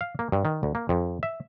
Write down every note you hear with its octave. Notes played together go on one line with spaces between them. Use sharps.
F5
A#3
G2
D#3
D2
A#3
F2
E5